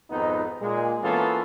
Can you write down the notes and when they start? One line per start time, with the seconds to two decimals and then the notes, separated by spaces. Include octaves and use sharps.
0.11 G#1 F2 B3 D#4
0.61 A#2 G#3
1.04 E3 A#3 B3 C#4 F4 A4